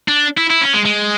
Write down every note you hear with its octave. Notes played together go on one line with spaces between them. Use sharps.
D4
E4
E4
C#4
G#3
G#3